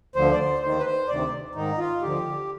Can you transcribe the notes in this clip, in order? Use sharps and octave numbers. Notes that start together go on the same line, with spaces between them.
D2 D3 F3 C5
D5
C5
D#2 D#3 C5
B4
C5
D2 C3 D#3 D5
G#2 D#3 D#4
F4
D2 D3 F3 G4